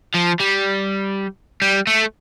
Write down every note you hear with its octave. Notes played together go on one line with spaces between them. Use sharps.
F3
G3
G3
A3